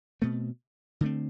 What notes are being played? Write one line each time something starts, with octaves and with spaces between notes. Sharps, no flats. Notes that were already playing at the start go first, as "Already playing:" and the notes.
B2 A3 C4
D3 A3 C4